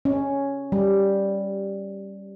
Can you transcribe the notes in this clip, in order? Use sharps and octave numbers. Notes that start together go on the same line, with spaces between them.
C#4
G3